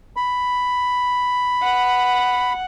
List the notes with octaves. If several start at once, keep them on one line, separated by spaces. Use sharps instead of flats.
B5
F#5